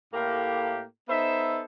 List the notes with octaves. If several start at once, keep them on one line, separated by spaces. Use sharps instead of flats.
A2 A#3 G4
B3 D#4 A4 C5 E5